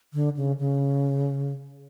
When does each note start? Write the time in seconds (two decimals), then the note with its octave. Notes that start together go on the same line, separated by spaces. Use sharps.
0.14 D3
0.37 C#3
0.59 C#3